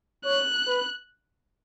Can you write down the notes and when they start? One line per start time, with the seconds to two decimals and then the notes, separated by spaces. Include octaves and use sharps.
0.25 C#5 F#6
0.67 B4